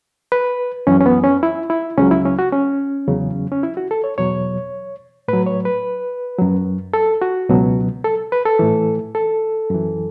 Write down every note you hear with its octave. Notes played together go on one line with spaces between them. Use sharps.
B4
F#2 E3 C#4
C#4
B3
C#4
E4
E4
C#2 C#3 F#3 C#4
E4
C#4
F#4
C#4
E2 C#3 F#3
C#4
E4
F#4
A4
C#5
E2 B2 F#3 C#5
A2 F#3 B4
C#5
B4
F#2 F#3
A4
F#4
C#2 B2 F#3
A4
B4
A4
A2 E3
A4
F#2 E3